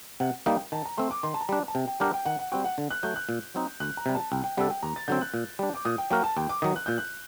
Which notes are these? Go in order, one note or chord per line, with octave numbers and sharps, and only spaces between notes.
C3 F#5
G3 A#3 D#4 G5
D#3 A5
A#5
A3 C4 C6
D6
D#3 C6
A5
A#5
G3 D4
A5
C3 G5
G5
G3 D4 G4 A#4 F#5
G5
D#3 F#5
F#5
G3 C4 F#4 G5
F#5
D3
F#6
F#3 A3 G6
F#6
A#2
F#3 C4 D#4
D2 F#6
A#5
C3 G3
A5
C2 G5
G5
C3 G3 D4 A4 F#5
G5
D#2 A#5
A6
D3 F#3 C4 G6
F#6
A#2
G3 D4
D6
A#2 D#6
G5
F#3 A#3 F#4 A#4 G5
A5
D#2 G5
D6
D#3 F#3 D#6
F#6
A#2 G6
F#6